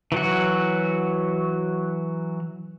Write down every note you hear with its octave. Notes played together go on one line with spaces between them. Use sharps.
E3 F#3 F#4